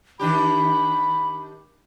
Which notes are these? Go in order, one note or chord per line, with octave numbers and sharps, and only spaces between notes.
D#3 D4 G4 B5